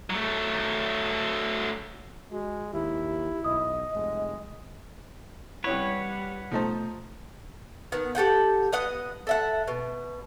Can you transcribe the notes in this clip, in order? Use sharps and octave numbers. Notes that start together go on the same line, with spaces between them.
F#3 A3
G#3 F#4
D#2 E4 G4
B1 D#5 D#6
F1 G#3
C3 G3 C#4 E4 B4 C#5 F#5
B2 F3 A3 D#4 C5 A5
D#3 B3
G4 A4 F#5 G5
B3 D#5 F#5
A4 E5 F#5
B2